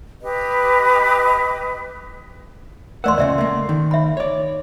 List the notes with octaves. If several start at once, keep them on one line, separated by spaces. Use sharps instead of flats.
G4 B4 D#5
E2 A3 A#4 D5 F#5 C6
C#2 A#2 C#3 D5 E5
A3 A#3
D#3
E5 B5
C#5 D5